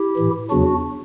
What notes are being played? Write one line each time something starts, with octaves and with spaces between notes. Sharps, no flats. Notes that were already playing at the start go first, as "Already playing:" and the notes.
Already playing: E4 G4
A2 E3
E2 C#3 F#3 D4 F#4